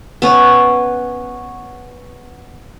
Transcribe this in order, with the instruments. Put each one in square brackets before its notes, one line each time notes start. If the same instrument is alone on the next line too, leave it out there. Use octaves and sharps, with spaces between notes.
[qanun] B3 C#4